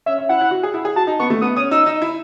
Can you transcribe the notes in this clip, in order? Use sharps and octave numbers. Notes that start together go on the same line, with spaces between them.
C#4 E5
C#4
E4 F#5
E4
F#4
G#4
E4
G#4
F#4 A5
D#4
B3 C#6
A3
B3 D#6
C#4 D#6
D#4 E6
D#4
E4